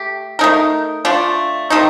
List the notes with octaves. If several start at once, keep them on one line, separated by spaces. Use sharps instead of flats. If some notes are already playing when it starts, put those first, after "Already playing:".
Already playing: A3 G4
A3 D#4 A#4
A3 D4 F4
C3 D#3 A3 D#4